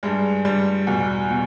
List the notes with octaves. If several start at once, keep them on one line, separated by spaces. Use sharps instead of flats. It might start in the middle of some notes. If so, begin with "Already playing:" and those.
G2 G3 G#3
G2 G3
E2 B2 G3
B2